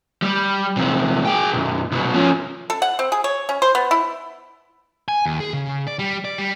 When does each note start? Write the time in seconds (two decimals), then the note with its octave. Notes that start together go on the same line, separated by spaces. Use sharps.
0.22 G3
0.77 E2 C3
1.25 G#4 G5
1.53 B1 F#2
1.92 C2 B2
2.14 F3 C#4
2.70 A4
2.82 F#5
2.99 C4
3.12 G#4
3.24 C#5
3.49 C#4
3.62 C5
3.75 B3
3.91 E4
5.08 G#5
5.26 D#2
5.40 G#4
5.53 C#3
5.87 D5
5.99 G3
6.25 D5
6.38 G3